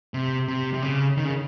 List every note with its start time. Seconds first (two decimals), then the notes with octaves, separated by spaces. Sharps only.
0.14 C3
0.48 C3
0.74 C3
0.82 C#3
1.17 D#3
1.25 C#3